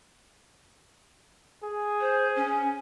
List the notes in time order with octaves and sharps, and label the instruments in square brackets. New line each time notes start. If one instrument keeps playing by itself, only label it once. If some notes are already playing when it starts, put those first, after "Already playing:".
[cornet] G#4
[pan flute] C5
C#4